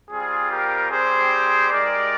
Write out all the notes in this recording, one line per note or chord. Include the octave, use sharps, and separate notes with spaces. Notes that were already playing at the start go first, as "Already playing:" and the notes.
G3 C4 F4 G#4
G4 A#4
G3 C4 G4 G#4 C5
G#3 D#4 G4 A#4 D5